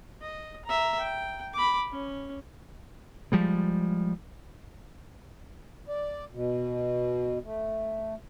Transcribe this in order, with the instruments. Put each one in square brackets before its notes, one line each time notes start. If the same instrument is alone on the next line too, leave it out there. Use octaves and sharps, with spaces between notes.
[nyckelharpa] D#5
E5 A#5
G5
B5 D6
C#4
[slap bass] F3 G3 G#3
[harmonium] D5
B2
A3